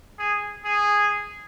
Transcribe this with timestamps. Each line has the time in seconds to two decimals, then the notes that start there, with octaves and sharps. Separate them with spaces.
0.19 G#4
0.65 G#4